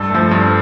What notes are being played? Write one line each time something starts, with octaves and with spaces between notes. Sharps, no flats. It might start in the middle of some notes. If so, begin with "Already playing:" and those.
Already playing: G2 A4
F3 A3
G2